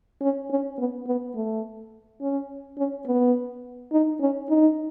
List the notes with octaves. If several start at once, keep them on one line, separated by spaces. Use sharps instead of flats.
C#4
C#4
B3
B3
A3
C#4
C#4
B3
D#4
C#4
D#4